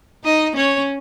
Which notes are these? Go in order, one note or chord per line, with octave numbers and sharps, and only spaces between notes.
D#4 D#5
C#4 C#5